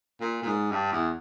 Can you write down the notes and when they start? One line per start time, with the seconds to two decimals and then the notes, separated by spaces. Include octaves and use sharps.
0.20 A#2
0.42 A#2
0.46 G#2
0.72 G2
0.92 E2